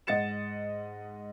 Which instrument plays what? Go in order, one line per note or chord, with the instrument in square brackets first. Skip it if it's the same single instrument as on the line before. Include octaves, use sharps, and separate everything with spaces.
[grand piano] G#2 D#5 F#5 A6 C#7 E7